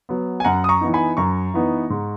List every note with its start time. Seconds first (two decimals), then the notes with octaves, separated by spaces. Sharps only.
0.09 F#3 B3
0.40 G#5
0.45 F#2 F#5 A#5
0.64 D#6
0.69 A#5 C#6
0.81 E3 B3 D#4
0.94 G#5 B5
1.17 F#2 A#5 C#6
1.54 E3 B3 D#4
1.90 G#2